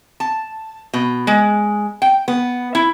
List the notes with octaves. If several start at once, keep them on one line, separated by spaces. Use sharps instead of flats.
A5
B2
G#3
G5
B3
E4